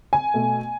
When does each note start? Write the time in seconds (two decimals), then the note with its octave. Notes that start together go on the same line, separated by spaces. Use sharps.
0.13 G#5
0.34 B2 A3